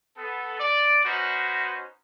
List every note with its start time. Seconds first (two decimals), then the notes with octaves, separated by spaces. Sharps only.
0.17 B3 A4
0.59 D5
1.05 C#4 D#4 F#4 B4 C5